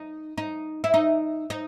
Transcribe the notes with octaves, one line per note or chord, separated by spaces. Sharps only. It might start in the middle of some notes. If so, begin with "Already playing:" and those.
Already playing: D#4
D#4
E4
D#4
D#4